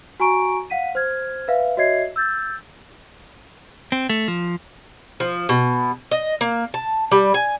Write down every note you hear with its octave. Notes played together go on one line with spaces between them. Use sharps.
F#4 G#5 A#5 C#6 D7
F5 F#5 B6 D#7
C5 F6 G#6
B4 E5 F5
F#4 C#5 D#5 E5 G#6 C7
E6 G6 A6
C4
A3
F3
F3
B2
D#5
A#3
A5
G3
G#5